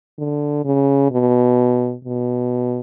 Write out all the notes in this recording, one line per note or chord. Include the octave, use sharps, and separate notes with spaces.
D3
C#3
B2
B2